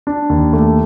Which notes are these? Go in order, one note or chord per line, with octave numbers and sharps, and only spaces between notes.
D4
D#2
A3